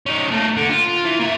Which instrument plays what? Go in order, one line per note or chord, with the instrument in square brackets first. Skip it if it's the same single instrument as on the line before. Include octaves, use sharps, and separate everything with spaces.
[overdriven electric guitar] C#4 D#4
A3 A#3
D3
F4
E3
A#3 E5